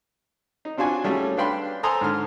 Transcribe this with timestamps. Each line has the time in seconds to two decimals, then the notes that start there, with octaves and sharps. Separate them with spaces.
0.65 D#4
0.77 C4 D4 F4 F#4 G#5
1.04 G3 A3 C#4 F#4 G#4
1.37 D4 B4 F5 G5 B5 C6
1.83 A4 C5 G#5 A#5 C6 D#6
2.01 G#2 D3 F6